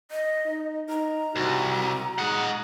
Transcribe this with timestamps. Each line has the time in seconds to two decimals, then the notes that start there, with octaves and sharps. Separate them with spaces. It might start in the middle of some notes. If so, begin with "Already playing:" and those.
0.11 D#5
0.46 D#4
0.89 D#4 A#5
1.36 C2 F#4
2.18 G#3 D#4 F#5